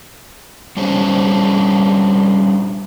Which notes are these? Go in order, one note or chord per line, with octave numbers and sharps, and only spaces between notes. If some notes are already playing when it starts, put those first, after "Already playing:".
G3 C#4 D4 G#4 C5 C#5